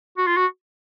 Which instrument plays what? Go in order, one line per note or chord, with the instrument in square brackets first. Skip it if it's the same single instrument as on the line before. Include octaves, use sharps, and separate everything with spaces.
[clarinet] F#4
F4
F#4